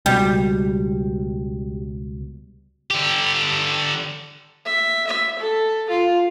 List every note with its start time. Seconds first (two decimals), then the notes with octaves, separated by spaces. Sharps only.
0.06 C#2 B2 G3
2.91 D3 G4
4.66 E5
5.06 E5
5.38 A4
5.89 F4